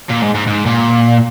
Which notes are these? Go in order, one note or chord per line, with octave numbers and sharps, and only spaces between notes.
A#2
G#2
G#2
G#2
A#2